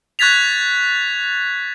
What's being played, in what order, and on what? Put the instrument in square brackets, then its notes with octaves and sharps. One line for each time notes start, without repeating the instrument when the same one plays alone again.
[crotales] C#6 F#6 G#6 A6 B6 F7